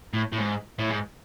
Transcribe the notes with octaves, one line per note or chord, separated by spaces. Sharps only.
A2
A2
G#2
A2
G#2